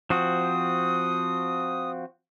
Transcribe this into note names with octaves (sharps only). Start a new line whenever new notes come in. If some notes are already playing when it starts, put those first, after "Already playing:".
F3 C4 F#4 D#6